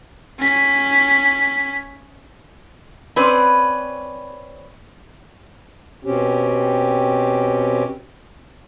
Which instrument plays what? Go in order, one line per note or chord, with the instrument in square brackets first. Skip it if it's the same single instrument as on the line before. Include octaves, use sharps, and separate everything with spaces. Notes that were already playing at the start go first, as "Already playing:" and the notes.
[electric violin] C#4 B6
[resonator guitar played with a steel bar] C4 C#4 B4 D5
[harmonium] B2 C4 C#4 G4